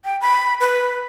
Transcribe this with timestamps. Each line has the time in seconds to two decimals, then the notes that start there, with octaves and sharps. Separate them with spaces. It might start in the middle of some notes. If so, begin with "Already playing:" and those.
0.05 G5
0.21 B5
0.60 B4